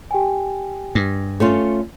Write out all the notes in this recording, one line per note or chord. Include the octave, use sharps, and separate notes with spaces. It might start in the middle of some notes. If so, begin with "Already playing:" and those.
G4 G5 G#5
G2
A3 C#4 F4